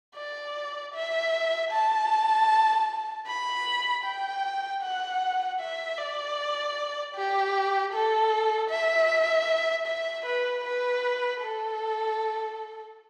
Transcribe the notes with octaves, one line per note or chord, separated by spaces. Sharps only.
D5
E5
A5
B5
G5
F#5
E5
D5
G4
A4
E5
E5
B4
B4
A4